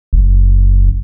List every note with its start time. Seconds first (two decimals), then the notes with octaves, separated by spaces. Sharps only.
0.13 F#1